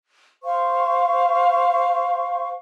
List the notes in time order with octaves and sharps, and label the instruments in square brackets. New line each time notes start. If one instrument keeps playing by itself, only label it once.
[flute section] C5 F5 C#6